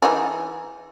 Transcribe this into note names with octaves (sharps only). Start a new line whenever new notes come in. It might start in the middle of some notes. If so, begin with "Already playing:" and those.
E3 D#4 G#4